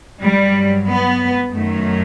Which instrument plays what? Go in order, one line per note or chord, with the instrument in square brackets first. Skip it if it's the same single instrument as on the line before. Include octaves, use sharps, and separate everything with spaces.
[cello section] G2 F#3 G3
B3
F#2 D#3 F#3 A3